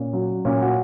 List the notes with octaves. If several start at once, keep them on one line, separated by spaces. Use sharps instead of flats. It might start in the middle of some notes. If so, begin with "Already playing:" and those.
Already playing: A#2 C#4
F#3
A#2 C#4
F#4